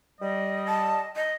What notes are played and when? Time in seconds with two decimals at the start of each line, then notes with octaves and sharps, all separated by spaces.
0.20 G3 D#5
0.68 A5
1.16 D#5